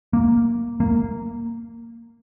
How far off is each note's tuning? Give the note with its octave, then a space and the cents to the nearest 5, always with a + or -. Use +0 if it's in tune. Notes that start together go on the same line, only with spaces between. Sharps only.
A#3 +0
A#3 -10